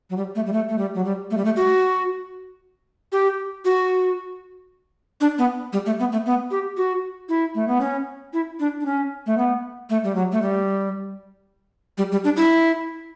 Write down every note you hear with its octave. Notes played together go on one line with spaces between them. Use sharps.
F#3
G3
A3
G3
A3
A3
G3
F#3
G3
A3
G3
A3
F#4
G4
F#4
D4
B3
G3
A3
B3
A3
B3
G4
F#4
E4
A3
B3
C#4
E4
D4
D4
C#4
A3
B3
A3
G3
F#3
A3
G3
G3
G3
D4
E4